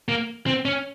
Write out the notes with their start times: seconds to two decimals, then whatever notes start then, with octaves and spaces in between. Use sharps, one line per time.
0.08 A#3
0.47 C4
0.65 C#4